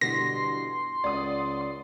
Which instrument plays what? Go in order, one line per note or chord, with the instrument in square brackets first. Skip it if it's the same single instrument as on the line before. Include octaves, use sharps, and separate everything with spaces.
[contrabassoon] G2 [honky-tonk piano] B2 D3 E3 [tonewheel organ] C6 [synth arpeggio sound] A#6
[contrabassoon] C#2 [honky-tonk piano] D5 F#5 D#6